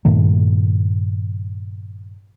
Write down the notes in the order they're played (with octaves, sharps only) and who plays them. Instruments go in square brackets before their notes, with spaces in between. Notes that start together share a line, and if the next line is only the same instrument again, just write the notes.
[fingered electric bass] G2 A#2 D#3 A3